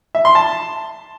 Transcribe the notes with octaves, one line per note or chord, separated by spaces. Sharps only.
E5
C6
A5